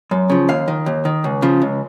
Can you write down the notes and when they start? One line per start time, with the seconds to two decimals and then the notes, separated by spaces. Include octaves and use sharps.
0.11 F#2
0.30 C#3 F3
0.49 D#2 F5
0.68 D#3
0.86 D#2
1.05 D#3
1.24 C#2
1.42 C#3 F3
1.62 C#2